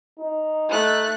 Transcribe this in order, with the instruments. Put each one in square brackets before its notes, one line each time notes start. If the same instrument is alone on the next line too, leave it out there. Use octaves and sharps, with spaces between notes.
[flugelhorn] D#4
[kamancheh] A3 F#6